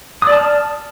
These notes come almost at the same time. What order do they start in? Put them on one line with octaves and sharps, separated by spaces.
D#6 D5 A5 F6